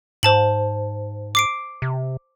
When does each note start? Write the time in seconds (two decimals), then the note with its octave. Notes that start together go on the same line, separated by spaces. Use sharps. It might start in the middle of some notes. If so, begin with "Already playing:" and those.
0.23 G#2 C5 A5 F#7
1.35 D6 C7 D7
1.82 C3